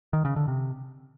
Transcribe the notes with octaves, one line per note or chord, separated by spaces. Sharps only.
D#3
C#3
D3
C3